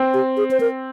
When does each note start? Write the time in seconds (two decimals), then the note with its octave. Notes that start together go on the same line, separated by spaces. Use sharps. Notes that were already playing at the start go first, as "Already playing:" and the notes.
Already playing: C4
0.14 G4
0.37 G#4
0.51 C5
0.60 A#4